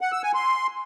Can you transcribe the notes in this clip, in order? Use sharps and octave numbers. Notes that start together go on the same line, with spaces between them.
F#5
E6
G#5
C6